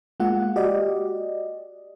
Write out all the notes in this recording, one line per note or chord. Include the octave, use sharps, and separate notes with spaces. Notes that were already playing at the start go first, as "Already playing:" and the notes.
G#3 A#3 F4 F#5
F#4 G4 D5 D#5